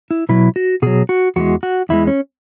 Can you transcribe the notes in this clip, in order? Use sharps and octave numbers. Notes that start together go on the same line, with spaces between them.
E4
B2 F#3 E4
F#4
B2 F#3 G#4
F#4
E2 E3 G#3 F#4
F#4
E2 E3 G#3 E4
C#4